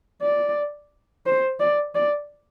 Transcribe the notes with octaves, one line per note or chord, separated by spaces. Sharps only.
D5
C5
D5
D5